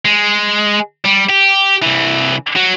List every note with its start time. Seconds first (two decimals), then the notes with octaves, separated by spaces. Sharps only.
0.05 G#3
1.05 G3
1.30 G4
1.82 C2 E3
2.56 F#3